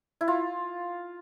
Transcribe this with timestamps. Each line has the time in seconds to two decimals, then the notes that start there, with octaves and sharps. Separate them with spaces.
0.21 E4
0.28 F4